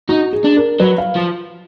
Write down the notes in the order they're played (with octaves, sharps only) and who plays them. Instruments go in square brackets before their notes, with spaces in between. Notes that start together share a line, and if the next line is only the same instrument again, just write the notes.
[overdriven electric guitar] D#4 [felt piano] F#4
[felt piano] G#4
[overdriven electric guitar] D4
[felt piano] A#4
[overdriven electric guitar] F#3 [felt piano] B4
[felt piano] F5
[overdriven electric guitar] F3